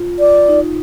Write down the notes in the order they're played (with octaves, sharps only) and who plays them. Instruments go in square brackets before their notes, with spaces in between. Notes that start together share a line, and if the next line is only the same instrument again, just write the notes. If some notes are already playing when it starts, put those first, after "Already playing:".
Already playing: [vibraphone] F4
[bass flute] D5
[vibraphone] D#4